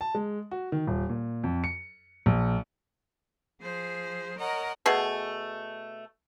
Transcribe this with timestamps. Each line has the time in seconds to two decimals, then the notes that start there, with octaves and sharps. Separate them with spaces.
0.01 A5
0.15 G#3
0.51 F#4
0.72 D#3
0.87 D#1
1.09 A#2
1.44 F2
1.64 C#7
2.26 A#1
3.61 F3 G#4 C5
4.39 A#4 C#5 D#5 F#5 A#5
4.86 B2 A3 G#4